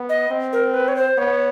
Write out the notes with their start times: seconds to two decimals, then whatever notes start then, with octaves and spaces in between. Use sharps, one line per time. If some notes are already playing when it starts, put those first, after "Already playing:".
Already playing: B3
0.09 D#5
0.30 C4
0.53 A#4
0.74 B4
0.88 C#5
0.96 C5
1.18 B3 C#5